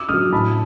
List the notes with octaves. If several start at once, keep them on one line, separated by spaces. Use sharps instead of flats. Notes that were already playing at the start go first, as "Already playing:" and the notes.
Already playing: D6 E6
D3 F#3 D#6 F6
A2 A5 B5